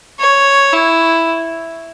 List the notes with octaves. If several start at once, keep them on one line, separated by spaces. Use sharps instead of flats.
C#5
E4